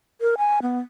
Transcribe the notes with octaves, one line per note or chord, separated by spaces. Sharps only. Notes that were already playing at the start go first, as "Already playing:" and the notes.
A#4
G#5
B3